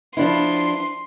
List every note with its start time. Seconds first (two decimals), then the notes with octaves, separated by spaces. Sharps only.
0.17 F3 D4 E4 C6